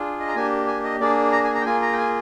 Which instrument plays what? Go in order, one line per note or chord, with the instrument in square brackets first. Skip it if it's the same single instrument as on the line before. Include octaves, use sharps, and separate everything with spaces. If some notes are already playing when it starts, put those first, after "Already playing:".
Already playing: [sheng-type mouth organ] D4 F4 G#4
D#5
A#5
A#3 D4 G4 G#5
G#5
D#5
A#3 D4 G#4 D5
A#5
G#5
A#5
G5
A#3 F4 G#4 G#5
A#5
G5
G#5